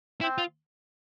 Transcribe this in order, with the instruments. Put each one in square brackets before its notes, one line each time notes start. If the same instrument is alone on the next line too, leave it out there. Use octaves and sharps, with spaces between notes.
[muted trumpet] C4 [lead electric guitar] E4
[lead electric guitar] F4